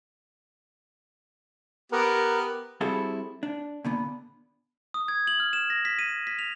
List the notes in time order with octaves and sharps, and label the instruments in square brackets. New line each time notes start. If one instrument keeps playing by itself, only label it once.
[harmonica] B3 G4 [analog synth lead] A#4
[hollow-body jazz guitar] G3 C4 E4 F#4 G#4 A4
D4
A#2 D3 B3
[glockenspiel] D#6
G#6
F#7
F6
E7
A#6
B6
D#7
B6
F7